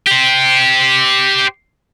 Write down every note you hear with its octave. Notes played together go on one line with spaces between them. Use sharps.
G4 C5